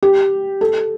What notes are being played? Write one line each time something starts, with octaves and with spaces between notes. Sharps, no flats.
G4
A4